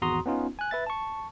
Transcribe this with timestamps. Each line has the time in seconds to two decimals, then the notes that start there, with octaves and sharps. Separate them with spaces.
0.02 G#1 E2 F#4 A#5 C6 D#6
0.26 B3 C#4 D#4 F4
0.59 G#5 F#6
0.71 B4 E5 A6
0.87 A5 C#6